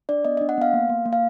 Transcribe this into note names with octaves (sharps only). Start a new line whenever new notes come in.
D4 D5
B3 D#5
D#5
D4
F#5
B3 F5
A#3
A#3
A#3
F5